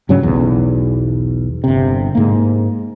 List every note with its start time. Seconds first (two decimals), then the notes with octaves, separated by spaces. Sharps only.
0.09 G2 C#3 F#3 C#4
0.23 B1 E2
1.64 G1 C3
2.15 G#2 A#3